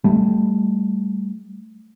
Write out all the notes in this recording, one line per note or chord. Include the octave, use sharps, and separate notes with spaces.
G3 A3